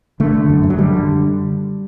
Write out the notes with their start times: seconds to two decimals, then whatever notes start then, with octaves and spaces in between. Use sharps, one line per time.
0.20 D3 A3
0.34 D3
0.49 F#2
0.63 F#2
0.70 F#3
0.78 D3 G3
0.93 D3